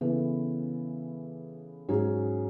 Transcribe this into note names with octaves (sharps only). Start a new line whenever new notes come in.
C#3 E3 B3 E4 A4
G#2 F#3 C#4 G#4